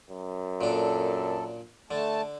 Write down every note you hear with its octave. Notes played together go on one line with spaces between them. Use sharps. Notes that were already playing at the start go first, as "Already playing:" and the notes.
F#2
A#2 D4 A4
D3 A3 A5